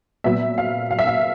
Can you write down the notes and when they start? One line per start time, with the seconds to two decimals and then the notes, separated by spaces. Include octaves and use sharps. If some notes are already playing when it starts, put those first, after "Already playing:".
0.24 A#2 F#3 B3 E5
0.58 F5
0.91 F5
0.99 E5
1.07 F5